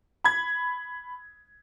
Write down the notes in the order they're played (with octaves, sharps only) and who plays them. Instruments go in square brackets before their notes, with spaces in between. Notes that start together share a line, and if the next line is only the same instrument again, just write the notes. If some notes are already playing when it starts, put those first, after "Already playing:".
[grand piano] B5 G#6